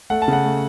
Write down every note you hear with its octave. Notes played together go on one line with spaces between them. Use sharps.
A3 F#5
A5
C#3 F#5
A3